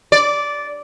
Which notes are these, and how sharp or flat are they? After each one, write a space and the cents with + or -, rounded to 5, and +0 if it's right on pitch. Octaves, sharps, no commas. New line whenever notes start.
D5 -10